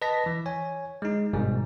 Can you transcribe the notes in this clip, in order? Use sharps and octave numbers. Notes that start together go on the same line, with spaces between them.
B4 D#5 A5 A#6 B6
E3
C#5 G#5
G#3 D#4
G1 G#2 B2 G3